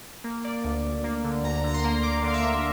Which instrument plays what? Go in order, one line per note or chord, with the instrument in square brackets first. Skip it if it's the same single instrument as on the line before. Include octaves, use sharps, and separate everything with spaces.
[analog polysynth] A#3
A#3 D5
D2
D2
A#3
D3
D2 A#5
D3 A#5
C6
A#3
A#3 D6
D3 F5
E5
D2